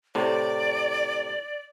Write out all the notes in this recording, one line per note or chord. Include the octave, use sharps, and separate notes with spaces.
A2 C3 D5